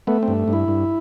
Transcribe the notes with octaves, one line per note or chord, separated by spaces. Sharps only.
A3 B3
C4
G2
G2
E4
G2